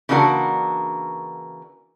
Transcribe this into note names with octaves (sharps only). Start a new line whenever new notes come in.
C#3 E3 A#3 D4 F#4 A#4